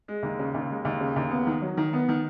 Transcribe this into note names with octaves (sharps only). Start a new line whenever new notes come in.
G#3
D#2
C#3
D#2
G#3
D#2
C#3
D#2
B3
D#3
F#3
D#3
B3
D#3